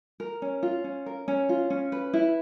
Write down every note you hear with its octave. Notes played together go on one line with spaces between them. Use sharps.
A#4
C#4
F4
C#4
A#4
C#4
F4
C#4
B4
E4